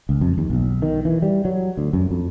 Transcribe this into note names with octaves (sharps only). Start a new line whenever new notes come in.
C#2
F2
D#2
B1
D#3
E3
G3
F#3
D2
F#2
F2